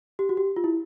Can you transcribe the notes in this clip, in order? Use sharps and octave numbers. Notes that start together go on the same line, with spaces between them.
G4
F#4
G4
F4
E4